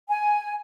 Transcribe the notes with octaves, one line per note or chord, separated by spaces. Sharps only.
G#5